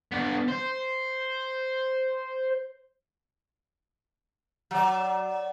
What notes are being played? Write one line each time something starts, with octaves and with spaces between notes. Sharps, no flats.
B3 D4
C5
F#3 D5